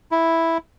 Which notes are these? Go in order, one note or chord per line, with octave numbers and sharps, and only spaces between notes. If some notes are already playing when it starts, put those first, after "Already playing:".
E4